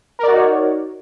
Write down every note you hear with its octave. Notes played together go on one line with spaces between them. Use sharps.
D#4 F#4 A#4 C#5 D5